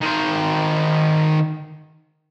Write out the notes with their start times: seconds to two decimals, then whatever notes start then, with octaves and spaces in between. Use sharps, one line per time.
0.01 D#3 C5